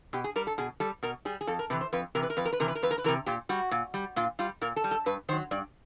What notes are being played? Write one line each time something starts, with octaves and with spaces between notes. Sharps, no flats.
B2 G4
G#4
G3 A#4
A4
B2 G#4
G3 A4
B2 A#4
G3 G#4
G#4
F2 A4
A#4
C3 E3 B4
C5
F2 B4
C3 E3 A#4
B4
A#4
F2 B4
A#4
B4
C3 E3 A#4
B4
A#4
F2 B4
A#4
B4
C3 E3 A#4
A#2 G4
G3 F#4
A#2
G3
A#2 F4
G3 F4
A#2 A#4
A4
G3
A4
G2 B4
D#3 F#3 C5
G2 D5